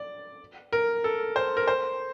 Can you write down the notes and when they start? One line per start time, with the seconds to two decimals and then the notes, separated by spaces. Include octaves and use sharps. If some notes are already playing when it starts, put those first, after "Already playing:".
Already playing: D5
0.73 A#4
1.04 A4
1.36 C5
1.57 A#4
1.68 C5